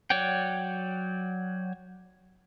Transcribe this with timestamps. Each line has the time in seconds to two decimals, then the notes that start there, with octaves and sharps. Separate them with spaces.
0.10 F#3 C#5 D5 F#5 G5